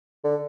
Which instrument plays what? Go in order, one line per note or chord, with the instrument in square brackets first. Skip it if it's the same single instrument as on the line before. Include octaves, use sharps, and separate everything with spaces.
[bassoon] D3